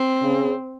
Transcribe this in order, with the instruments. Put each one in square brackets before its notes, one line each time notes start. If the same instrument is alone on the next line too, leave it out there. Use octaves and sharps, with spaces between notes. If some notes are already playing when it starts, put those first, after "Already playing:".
Already playing: [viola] C4
[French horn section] C#3